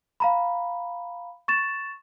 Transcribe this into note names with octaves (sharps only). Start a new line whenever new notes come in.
F5 A#5 B5
C#6 A6 E7